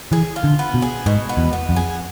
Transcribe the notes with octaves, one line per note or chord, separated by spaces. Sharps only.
E3 G#4
F4
D3
B3
B2
G#4
G#2 B2
B3
E2
B3
F2
G#4